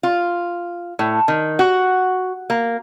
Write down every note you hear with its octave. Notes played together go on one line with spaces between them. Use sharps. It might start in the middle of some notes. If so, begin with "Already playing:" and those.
F4
A2
D#3
F#4
A#3